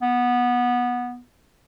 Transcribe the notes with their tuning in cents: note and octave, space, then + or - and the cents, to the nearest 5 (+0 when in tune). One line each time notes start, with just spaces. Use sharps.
B3 -15